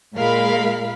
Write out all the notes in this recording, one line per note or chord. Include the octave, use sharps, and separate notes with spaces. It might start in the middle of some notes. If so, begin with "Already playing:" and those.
A#2 G#3 A#4 F5 B5